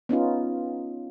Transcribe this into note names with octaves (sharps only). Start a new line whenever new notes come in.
B3 C#4 D#4 F4